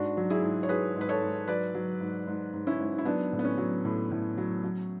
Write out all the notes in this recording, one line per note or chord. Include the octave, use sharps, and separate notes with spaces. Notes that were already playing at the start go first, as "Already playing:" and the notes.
Already playing: G#2 D4 F#4
F#3
E4 G#4
G#2
C#5
F#3 G#4 B4
G#2
B4
A4 C#5
G#2
F#3 B4 D5
F#3
G#2
G#2
G#2
C#4 E4
G#2
E4
F#3 B3 D4
A2
B3
C#4
F#3
A2
A2
F#3
F#3